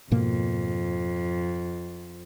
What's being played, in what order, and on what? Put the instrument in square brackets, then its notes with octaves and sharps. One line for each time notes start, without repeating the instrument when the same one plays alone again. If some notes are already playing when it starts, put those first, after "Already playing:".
[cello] F2 [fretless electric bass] G#2 B2 A#3